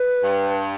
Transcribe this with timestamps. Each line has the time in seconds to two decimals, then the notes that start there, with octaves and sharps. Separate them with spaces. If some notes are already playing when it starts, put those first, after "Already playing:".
Already playing: B4
0.23 G2